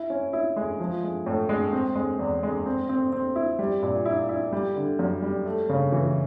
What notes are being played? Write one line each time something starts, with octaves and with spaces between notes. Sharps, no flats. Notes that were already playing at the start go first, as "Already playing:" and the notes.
Already playing: E4
C#4
E4
G#3
F3
G#3
A2
G#3
C4
G#3
E2
G#3
C4
C4
C4
E4
G3
A#2
E4
E4
G3
D3
F#2
G3
A3
C#3
E3